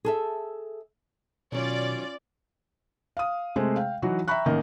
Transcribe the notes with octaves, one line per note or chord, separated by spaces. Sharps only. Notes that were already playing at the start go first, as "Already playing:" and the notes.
G#4 A4 E5
B2 D#3 F#3 C#4 F4 D5
F5 D#6
C3 G#3 A3 G#4 C5
F5 G5
E3 F#3 D#4 F#4
E5 G5 A#5 B5 C#6 F#6
A1 D#3 A#3 D#5